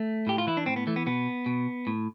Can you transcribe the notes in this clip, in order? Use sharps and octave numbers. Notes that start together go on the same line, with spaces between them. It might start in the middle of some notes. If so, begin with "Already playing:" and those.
Already playing: A3
A2 G4
F4
E3 E4
D4
A2 C4
B3
E3 A3
B3
B2 B3
B2
A2